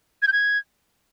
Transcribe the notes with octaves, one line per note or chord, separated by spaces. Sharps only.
G#6
G6
G#6